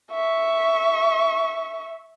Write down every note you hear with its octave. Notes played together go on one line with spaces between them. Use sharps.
E5 C#6